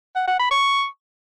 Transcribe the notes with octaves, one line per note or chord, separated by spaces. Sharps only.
F#5
F#5
B5
C#6